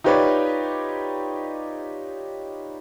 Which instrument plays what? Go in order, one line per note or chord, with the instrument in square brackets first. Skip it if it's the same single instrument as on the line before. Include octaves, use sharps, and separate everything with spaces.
[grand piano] D#4 F4 G4 B4 C#5 D5